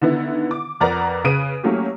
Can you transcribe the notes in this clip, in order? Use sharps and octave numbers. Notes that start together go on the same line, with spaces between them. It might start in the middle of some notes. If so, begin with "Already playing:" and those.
D3 D#3 B3 E4
D6
F2 A#4 B4 D5 F#5 A#5
C#3 B4 D#6 D7 D#7
F#3 A3 A#3 C#4 E4 G4